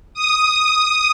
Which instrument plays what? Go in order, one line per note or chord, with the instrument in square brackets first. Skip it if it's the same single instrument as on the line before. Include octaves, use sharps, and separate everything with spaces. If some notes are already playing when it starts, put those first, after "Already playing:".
[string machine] D#6